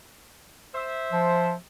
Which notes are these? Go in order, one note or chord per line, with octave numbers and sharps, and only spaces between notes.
C5 E5
F3